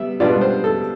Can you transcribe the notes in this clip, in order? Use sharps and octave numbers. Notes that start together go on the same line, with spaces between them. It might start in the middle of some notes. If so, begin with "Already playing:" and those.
Already playing: G3 B3 E5
B2 G3 B3 D4 F4 D5
C5
A4